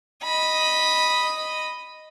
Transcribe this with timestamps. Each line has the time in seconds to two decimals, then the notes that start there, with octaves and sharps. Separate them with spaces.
0.24 D#5 B5